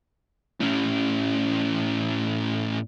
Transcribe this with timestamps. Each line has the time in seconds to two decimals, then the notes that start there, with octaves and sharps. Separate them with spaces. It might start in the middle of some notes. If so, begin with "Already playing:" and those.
0.60 A2 C#4